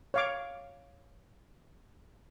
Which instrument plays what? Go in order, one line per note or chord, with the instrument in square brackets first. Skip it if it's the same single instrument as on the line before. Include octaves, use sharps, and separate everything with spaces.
[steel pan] C#5 F5 D6